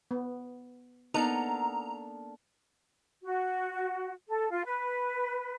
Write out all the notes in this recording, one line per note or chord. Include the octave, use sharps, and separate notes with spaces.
B3
A#3 B3 D4 D#4 A4 A#5
F#4
A4
F4
B4